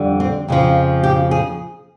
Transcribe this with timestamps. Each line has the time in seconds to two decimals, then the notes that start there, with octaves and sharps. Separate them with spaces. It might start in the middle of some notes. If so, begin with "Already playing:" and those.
Already playing: F2 D3 G3
0.20 C4
0.48 F2 C#3 F3
1.03 G4
1.31 G#4